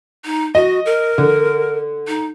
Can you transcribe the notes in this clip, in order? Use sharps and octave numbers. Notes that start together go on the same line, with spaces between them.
D#4
F#4 D#5
A#4
D3
D#4